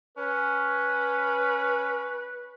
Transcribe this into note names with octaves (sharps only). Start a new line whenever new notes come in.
C#4 B4